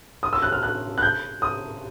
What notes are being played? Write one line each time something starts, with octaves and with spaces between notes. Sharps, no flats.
D#6
E6
F#6
F6
F#6
F#6
G6
D#6